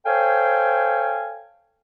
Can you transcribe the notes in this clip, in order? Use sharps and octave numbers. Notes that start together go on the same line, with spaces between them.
A4 C5 C#5 F5 G5 G#5